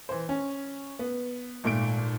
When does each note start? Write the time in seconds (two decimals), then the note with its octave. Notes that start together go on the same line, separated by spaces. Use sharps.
0.09 E3 C5
0.29 C#4
0.99 B3
1.64 G#1 A#2 A3 D7